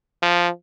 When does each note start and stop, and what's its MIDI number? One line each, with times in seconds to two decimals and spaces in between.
0.22 0.49 53